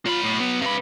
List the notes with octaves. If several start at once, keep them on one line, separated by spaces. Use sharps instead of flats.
F#3 F4 B5
A2
B3
C3 B4 F5 B5